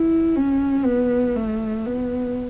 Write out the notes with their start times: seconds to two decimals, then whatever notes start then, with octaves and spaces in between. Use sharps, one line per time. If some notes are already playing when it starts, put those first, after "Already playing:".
Already playing: E4
0.36 C#4
0.86 B3
1.36 A3
1.86 B3